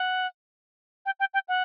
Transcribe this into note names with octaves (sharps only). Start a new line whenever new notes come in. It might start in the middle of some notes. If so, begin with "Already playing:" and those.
Already playing: F#5
G5
G5
G5
F#5